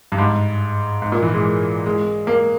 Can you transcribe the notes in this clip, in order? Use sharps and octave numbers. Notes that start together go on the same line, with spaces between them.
G2
G#2
G#2
A#2
E3
G#3
G#3
A#3